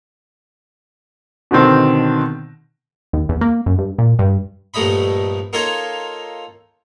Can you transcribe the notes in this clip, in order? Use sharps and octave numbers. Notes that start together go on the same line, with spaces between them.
B2 D3 D#3 C4
D#2
E2
A#3
F#2
G2
A#2
G2
A#1 G2 A3 D#4 D#5 B5
A#3 D#4 F4 A4 C#5